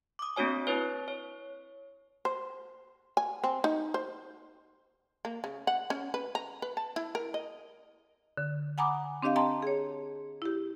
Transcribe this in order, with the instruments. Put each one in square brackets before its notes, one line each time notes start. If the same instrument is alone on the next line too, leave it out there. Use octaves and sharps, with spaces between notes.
[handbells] D6 D#6
A#3 C4 D4 F#4 C#5 G#5
E4 B4 C#5
C#5
[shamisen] C5
G#5
C4
D#4
C5
A#3
C#3
F#5
C#4
B4
A#5
B4
A5
E4
A#4
D#5
[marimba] D3
F#5 G#5 A#5 B5 D6 D#6
C4 D4 G4 D#5 F5
D#5 G5 A5 A#5 C6
G#4 C#5
E4 G4